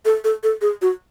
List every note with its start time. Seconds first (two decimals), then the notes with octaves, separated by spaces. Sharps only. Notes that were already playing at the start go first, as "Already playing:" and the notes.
0.05 A4
0.24 A4
0.43 A4
0.61 G#4
0.82 F#4